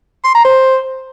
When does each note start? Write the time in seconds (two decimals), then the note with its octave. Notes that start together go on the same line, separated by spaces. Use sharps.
0.25 C6
0.35 A#5
0.45 C5